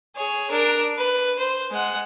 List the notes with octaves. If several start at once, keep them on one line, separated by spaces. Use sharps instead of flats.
G#4 C#5
D4 A#4
B4
C5
G#3 F#5